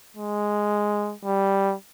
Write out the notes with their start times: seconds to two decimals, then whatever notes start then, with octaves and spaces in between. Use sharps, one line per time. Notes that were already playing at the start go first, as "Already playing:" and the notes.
0.17 G#3
1.25 G3